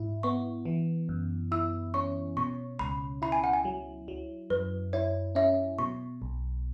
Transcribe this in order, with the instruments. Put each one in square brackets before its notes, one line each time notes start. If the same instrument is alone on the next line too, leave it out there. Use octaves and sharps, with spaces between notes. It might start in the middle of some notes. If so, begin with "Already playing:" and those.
Already playing: [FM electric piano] G#2 E4
[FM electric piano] B3 [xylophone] C#6
[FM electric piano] E3
F#2
[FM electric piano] E4 [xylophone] E6
[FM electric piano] C#4 [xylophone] C#6
[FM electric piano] B2 [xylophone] C#6
[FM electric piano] C#2 [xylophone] B5
[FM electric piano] E4 [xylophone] B5
[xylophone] G#5
F#5
G#5
[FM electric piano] F#3
F#3
[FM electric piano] F#2 [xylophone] B4
[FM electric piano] E4 [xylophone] C#5
[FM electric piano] C#4 [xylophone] E5
[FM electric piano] B2 [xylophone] C#6
[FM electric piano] B1